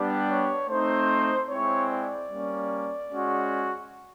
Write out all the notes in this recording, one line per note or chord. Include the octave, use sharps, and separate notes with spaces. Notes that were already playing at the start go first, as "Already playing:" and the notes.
Already playing: G3 B3 D4 G4
C#5
A3 C4 D#4 C5
G#3 C4 E4 C#5
D5
G3 A#3 C#4
G#3 C#4 F#4